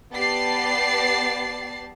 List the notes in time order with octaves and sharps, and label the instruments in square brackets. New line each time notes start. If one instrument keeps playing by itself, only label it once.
[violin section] B3 G4 D5 A5 A6 C7